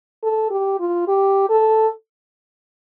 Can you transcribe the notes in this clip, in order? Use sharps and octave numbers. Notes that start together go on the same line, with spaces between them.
A4
G4
F4
G4
A4